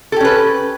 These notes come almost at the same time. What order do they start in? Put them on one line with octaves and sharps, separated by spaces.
A4 G4 C#4 B4